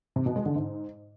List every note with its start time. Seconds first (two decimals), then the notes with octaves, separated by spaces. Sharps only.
0.16 C3
0.26 B2
0.36 G#3
0.46 D3
0.56 G#2